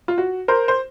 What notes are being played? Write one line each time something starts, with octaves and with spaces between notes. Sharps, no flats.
F4
F#4
A#4 C5
C5